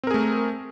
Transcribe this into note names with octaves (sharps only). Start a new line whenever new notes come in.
A3 C4 G#4 A#4